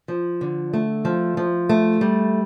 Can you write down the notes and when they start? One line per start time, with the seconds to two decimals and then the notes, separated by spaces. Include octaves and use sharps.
0.08 F3
0.41 D3
0.73 A3
1.05 F3
1.37 F3
1.69 A3
2.01 G3